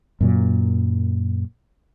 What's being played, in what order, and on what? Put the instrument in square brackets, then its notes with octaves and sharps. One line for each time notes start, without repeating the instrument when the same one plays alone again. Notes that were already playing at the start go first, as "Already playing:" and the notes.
[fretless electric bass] F#2 A#2 F#3